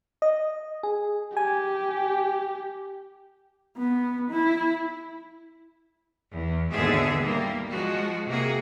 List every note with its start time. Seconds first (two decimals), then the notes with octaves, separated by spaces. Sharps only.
0.22 D#5
0.83 G#4
1.37 G4 G#5
3.77 B3
4.30 E4
6.30 E2
6.71 D#2 G#2 B2 D3 G#4 E5
7.21 G3 A#3
7.70 F3 G#3 F#4
8.27 C3 A#3 F#4 G#4